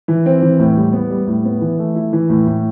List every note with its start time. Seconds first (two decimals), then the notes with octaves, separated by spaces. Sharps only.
0.08 E3
0.26 C4
0.42 E3
0.59 A2
0.77 G3
0.93 B3
1.10 G3
1.27 A2
1.45 B3
1.61 E3
1.79 A3
1.95 E4
2.13 E3
2.30 A2
2.47 A2